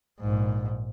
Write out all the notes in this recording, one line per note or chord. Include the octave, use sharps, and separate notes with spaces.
A#1 G#2